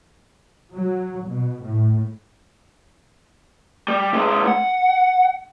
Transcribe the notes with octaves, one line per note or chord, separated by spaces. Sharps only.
F#3
B2
A2
G3
C3 G#3
F#5